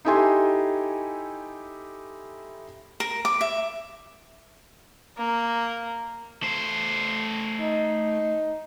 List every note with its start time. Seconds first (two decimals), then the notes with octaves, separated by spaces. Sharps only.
0.05 D#4 E4 G4 A4 G#5 C6
3.00 A#4
3.25 D6
3.41 E5
5.18 A#3
6.43 A3 C5
7.61 D#4